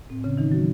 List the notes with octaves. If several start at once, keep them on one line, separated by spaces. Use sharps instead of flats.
A2 C4
C#3 C#4
D#3 E3 D#4
F#3 F#4